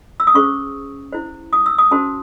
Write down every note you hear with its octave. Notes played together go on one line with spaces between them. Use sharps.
E6
D#6
C#4 G#4 C5 C#6
E4 C5
D#6
E6
D#6
C#4 F#4 C5 A5